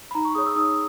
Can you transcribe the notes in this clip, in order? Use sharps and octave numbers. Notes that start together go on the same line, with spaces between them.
B5
D#4 A#5
C#6
G#4 C#5 D#6
E6
D#4 D#6